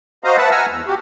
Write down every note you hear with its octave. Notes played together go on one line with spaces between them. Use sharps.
F#4 C5 D#5 F5 A#5
B4 E5 F#5 A5
F#5 G#5 A#5 E6 F6
E2
F#4 G4